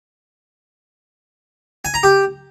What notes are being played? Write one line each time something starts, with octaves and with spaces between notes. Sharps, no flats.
G#5
A#5
G4